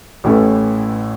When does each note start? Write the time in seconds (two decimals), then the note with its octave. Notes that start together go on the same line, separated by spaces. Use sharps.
0.24 A1 A2 E3 C#4 A4